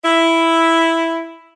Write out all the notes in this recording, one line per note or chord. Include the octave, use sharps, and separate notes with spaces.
E4